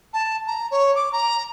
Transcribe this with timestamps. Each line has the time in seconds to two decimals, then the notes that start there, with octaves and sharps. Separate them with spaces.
0.13 A5
0.47 A#5
0.71 C#5
0.95 D6
1.12 A#5